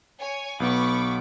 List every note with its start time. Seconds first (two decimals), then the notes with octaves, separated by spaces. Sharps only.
0.18 C#5 G#5
0.60 B1 B3 B5 C#6 D6